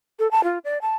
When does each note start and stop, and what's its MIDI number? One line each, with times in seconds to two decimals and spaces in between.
0.19 0.30 69
0.31 0.44 81
0.44 0.58 65
0.65 0.78 74
0.82 0.96 81